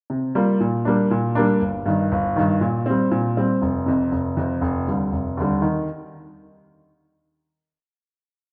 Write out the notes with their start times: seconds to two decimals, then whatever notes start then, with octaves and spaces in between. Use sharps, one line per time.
0.10 C3
0.35 G3 A#3 F4
0.60 A#2
0.85 G3 A#3 D4
1.11 A#2
1.35 G3 A#3 D4
1.62 G1
1.86 G2 D#3
2.12 G1
2.36 G2 D#3
2.61 A#2
2.86 G3 C4
3.11 A#2
3.37 G3 C4
3.62 F1
3.86 F2 C3
4.12 F1
4.37 F2 C3
4.61 F1
4.87 D#2 D3 G3
5.12 F1
5.37 D#2 D3 G3
5.62 D#3